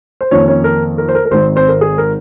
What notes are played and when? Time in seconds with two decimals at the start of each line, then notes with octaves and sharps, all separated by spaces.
0.21 C5
0.31 F2 D#3 A#3 C#4 C#5
0.48 C#4 C#5
0.64 A#4
0.98 A#4
1.09 C5
1.15 A#4
1.26 A#4
1.31 G#1 G#2 D#3 C4 C5
1.56 C4 C5
1.68 A#4
1.81 G#4
1.98 A#4